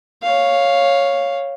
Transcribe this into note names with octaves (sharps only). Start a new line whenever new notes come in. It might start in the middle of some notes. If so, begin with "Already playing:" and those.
C#5 F5